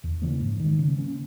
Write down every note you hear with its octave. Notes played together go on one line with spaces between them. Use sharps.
E2
C#3 E3 A#3
G#2
D#3 G#3
C#3
F#3 A#3 C#4